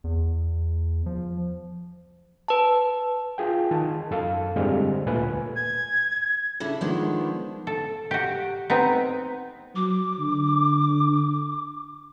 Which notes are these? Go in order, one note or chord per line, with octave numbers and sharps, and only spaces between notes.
E2
F3
B4 A5
F4 G#4 G5
D#3 A5
F#2 A4 F5
G#2 D3 G3 G#3 C4 F6
D2 A#2 A3 B4 G#5
G#6
C#3 D4 E4 A4
D#3 F3 G#3 B3 D4
A4
F#4 G4
B3 C4 D#4
F#3 D6
D3